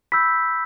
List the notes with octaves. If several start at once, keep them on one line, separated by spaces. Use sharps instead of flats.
B5 E6 G6 B6